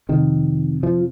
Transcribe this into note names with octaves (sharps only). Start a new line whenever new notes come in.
F2 C3 D#3
F3